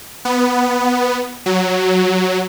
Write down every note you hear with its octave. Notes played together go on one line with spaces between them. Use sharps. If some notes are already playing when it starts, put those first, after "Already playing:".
B3
F#3